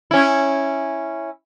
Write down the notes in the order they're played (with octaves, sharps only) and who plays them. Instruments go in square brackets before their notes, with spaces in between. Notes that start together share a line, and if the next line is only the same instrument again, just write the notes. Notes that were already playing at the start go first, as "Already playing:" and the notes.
[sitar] C#4 E4